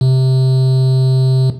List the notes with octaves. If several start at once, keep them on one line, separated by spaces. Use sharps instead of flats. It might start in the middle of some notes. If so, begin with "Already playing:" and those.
C3